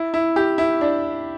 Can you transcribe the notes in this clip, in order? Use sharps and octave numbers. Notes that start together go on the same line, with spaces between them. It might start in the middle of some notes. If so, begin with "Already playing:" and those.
Already playing: E4
E4
G4
E4
D4